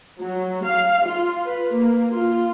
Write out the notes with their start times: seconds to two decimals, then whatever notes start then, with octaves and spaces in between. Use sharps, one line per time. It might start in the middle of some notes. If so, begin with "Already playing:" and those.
0.20 F#3
0.65 F5
1.06 F4
1.45 B4
1.74 A#3
2.12 F4